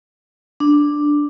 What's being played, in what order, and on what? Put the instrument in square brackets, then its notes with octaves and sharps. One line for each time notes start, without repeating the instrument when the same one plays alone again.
[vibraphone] D4